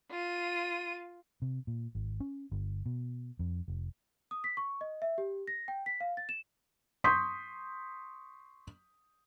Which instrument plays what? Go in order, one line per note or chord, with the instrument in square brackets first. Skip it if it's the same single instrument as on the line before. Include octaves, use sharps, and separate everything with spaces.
[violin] F4 D#7
[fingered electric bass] C3
A#2
G#1
C#4
G1
B2
F2
F1
[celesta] D#6
B6
C#6
D#5
E5
G4
A#6
G5
B6
F5
A6
E7
[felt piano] C6 C#6 D#6 G6 B6